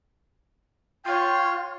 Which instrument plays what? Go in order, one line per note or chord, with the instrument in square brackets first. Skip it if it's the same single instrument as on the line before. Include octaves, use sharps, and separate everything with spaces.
[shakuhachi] F4 [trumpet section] C#5 G5 C6